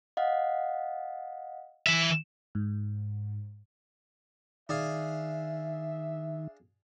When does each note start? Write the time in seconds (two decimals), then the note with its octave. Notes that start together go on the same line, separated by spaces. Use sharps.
0.17 D#5 F5 F#5
1.87 E3 E5
2.55 G#2
4.69 D#3 D4 G#4 E5 F5